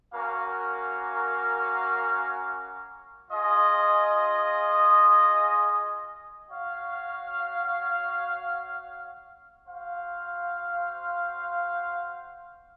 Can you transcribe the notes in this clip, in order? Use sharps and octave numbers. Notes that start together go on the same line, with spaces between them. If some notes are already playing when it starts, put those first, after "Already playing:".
A#3 C#4 F#4 A#4 F5
F4 G#4 D#5
F#4 C#5 F5
F#4 C5 F5